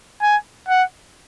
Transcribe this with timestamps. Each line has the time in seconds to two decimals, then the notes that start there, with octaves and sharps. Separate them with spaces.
0.22 G#5
0.69 F#5